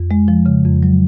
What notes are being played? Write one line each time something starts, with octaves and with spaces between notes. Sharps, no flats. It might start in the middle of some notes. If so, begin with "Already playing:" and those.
Already playing: F2
G#3
F3
C#3
F2
F#3